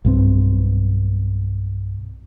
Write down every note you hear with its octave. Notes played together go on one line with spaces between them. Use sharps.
B1 G2 C4